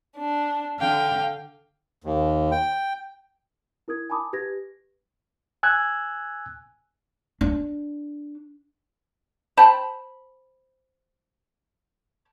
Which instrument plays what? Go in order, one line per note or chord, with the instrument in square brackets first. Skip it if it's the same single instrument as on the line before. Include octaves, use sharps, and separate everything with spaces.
[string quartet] D4
[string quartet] D3 [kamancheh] F5 G5
[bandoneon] D#2
G5
[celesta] E4 A#4 D#6 G#6
G#5 A5 B5 D6 D#6
G4 B4 G#6 A#6
[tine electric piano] G#5 E6 F#6 G#6
[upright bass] D4
[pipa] C5 G5 A5 B5